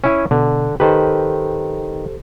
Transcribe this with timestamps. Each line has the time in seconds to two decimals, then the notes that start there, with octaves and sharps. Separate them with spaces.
0.04 C#4 E4 G#5
0.31 B2 D3
0.80 D#3 G4 A4 B4 C5